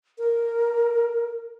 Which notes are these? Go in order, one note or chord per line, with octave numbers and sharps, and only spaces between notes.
A#4